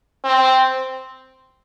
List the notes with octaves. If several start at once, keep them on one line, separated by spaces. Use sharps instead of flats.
C4